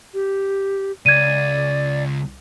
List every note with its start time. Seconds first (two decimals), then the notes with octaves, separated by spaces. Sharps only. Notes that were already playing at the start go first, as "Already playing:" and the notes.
0.14 G4
1.06 C#2 D5 G#6 D#7